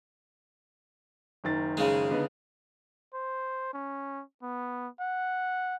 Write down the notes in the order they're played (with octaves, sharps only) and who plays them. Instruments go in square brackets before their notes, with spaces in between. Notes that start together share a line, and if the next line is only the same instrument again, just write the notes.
[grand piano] F#1 D#3 A6
[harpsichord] C#3 G#3
[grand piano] D3 B3 D#4
[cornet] C5
C#4
B3
F#5